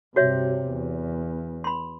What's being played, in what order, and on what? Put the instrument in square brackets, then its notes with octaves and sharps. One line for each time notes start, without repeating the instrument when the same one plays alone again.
[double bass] G2 C3 [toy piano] F#4 C#5 E5
[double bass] E2
[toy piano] B5 C6